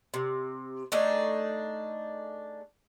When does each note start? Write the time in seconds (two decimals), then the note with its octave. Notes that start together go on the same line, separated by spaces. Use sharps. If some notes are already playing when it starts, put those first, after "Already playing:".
0.14 C3
0.92 A3 D4 D#4 G#4